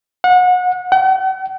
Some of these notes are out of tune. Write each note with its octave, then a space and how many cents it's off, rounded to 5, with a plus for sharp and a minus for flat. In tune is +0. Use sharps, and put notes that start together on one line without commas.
F#5 -30
F#5 +45